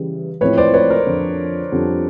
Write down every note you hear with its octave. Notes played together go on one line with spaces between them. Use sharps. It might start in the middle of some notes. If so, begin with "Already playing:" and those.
Already playing: C#3 E3 G3
A2 F3 G#3 C4 E4 B4 C#5
C5 D5
B4 C#5
A#4 C5
F2 D3 F3
F2 D3 G3